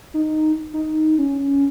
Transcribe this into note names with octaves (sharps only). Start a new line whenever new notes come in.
D#4
D#4
C#4